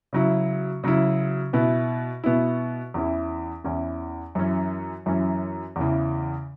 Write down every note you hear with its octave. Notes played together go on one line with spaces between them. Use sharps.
C#3 F#3 E4
C#3 F#3 E4
B2 B3 E4
B2 B3 E4
E2 E3 C#4 E4
E2 E3 C#4 E4
F#2 E3 C#4
F#2 E3 C#4
E2 C#3 E3